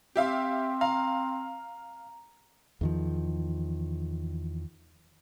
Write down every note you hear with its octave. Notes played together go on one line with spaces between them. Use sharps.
C4 G4 E5 F5
F5 A#5
E2 D#3 F3